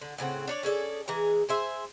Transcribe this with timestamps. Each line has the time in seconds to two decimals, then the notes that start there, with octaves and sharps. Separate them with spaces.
0.01 D3
0.18 A2 C#3 C4 F#5
0.48 D4 C#5 D5
0.63 C#4 G#4 A4 D5
1.08 E3 G#3 G#4 A#5
1.49 G#4 C5 E5